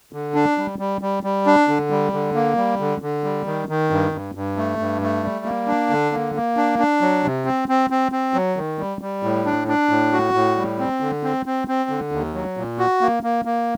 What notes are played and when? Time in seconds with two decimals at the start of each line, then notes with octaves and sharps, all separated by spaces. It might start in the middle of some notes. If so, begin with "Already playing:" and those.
0.13 D3
0.34 D4
0.58 G3
0.79 G3
1.01 G3
1.23 G3
1.46 D4
1.68 D3
1.90 G3
2.13 D3
2.35 A#3
2.57 G3
2.80 D3
3.02 D3
3.24 G3
3.46 D#3
3.69 D#3
3.90 G2
4.12 G2
4.35 G2
4.57 A3
4.79 G2
5.02 A3
5.24 G3
5.45 A#3
5.68 D4
5.90 D3
6.12 A#3
6.35 A#3
6.57 D4
6.79 D4
7.01 F#3
7.24 C3
7.45 C4
7.68 C4
7.90 C4
8.12 C4
8.34 F#3
8.57 D#3
8.79 G3
9.01 G3
9.23 A2
9.46 D4
9.68 D4
9.89 A2
10.13 F#4
10.34 A2
10.56 G3
10.79 C4
11.01 D3
11.23 C4
11.46 C4
11.68 C4
11.90 D3
12.12 D#2
12.34 F#3
12.57 A#2
12.78 F#4
13.01 A#3
13.23 A#3
13.45 A#3